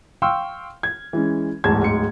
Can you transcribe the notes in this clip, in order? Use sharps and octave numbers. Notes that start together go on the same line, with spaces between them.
F5 G5 C6 C#6 E6 F6
G#6
E3 G#3 C#4
D1 E2 G#2 A5 G#6
D1 G#2 G#3 C#7